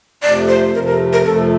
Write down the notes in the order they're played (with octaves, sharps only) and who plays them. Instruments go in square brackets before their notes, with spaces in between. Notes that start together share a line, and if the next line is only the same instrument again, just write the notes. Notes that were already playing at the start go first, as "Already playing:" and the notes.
[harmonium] F2 C3 F3 A3 [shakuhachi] D5
[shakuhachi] C5
[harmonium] F2 C3 F3 A3 [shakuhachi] A#4
[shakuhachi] A#4
A#4
[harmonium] F2 C3 F3 A3 [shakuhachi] A4